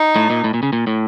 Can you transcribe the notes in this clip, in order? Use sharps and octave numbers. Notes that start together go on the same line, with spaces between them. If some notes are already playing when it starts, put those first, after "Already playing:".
Already playing: D#4
A2
A#2
A2
A#2
C#3
A#2
A2